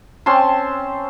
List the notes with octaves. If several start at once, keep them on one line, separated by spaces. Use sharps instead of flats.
C4 C#4 A5 C6